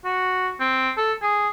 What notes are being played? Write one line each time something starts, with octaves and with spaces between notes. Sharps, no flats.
F#4
C4
A4
G#4